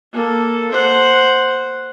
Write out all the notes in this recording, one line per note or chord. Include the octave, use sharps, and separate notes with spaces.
A#3 A4
C5 F#5